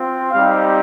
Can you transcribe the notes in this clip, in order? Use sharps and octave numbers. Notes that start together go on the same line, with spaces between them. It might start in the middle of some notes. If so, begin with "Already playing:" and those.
Already playing: C4 F4
G3 C4 D#4 G4 F5